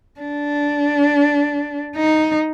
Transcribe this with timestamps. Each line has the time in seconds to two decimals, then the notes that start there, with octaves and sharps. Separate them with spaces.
0.20 D4
1.96 D#4